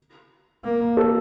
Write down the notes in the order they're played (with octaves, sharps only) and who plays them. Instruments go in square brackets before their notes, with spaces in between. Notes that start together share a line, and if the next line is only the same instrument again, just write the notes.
[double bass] A#3
[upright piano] A4